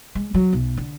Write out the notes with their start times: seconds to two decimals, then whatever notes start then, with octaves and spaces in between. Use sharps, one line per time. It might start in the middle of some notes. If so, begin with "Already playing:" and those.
0.15 G#3
0.34 F#3
0.53 B1
0.77 D3